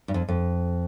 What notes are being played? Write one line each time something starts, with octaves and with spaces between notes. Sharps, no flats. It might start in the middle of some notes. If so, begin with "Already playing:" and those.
G2
F2
F2